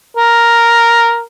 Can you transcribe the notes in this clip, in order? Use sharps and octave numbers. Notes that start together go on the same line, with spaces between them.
A#4